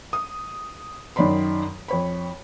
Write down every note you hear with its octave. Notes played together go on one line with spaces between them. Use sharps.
D#6
F#2 D#3 F#3 D5 B5 C6
F2 C#5 B5